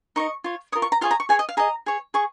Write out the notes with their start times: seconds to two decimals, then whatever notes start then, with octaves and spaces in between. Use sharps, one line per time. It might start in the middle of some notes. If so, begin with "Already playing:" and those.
0.16 D#4 A#4 D#5 C#6
0.44 F4 C#5
0.72 C#5 D#6
0.75 F4 A#4
0.82 C#6
0.92 A#5
1.01 F4 G#4 C#5 F5
1.11 A#5
1.20 C#6
1.29 G#4 C#5 G#5
1.39 D#5
1.49 F5
1.57 G#4 D#5 A#5
1.86 G#4 C#5
2.14 G#4 C#6